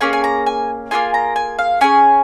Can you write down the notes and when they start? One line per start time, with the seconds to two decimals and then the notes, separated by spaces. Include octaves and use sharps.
0.01 A#3 C#4 G#4 G#5
0.13 G#5
0.24 A#5
0.46 G#5
0.91 A#3 C#4 F4 G#4 G#5
1.14 A#5
1.36 G#5
1.59 F5
1.81 C#4 G#4 G#5